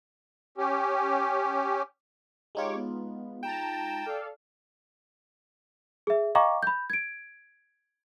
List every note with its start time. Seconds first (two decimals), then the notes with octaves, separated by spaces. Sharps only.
0.58 C#4 G4
2.55 G#3 D#4 F4 G4 C#5 D6
2.76 B3
3.43 G5 A5 A#5 E7
4.05 A4 D5 F5
6.07 G#4 E5
6.35 D#5 F5 G5 A#5 C#6 D6
6.63 B5 G6
6.90 G#6 D7